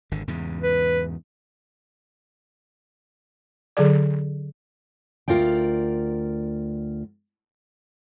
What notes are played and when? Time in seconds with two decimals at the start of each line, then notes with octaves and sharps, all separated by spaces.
0.12 G#1 D3
0.28 E2 G#2 C#3
0.63 B4
3.77 D3 F#3 G#4 D5
5.28 D2 C3 F4 A#4 D5 G5